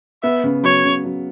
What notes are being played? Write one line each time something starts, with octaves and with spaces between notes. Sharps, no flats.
B3 E5
C#3
F#3 C#5
C#3
F#3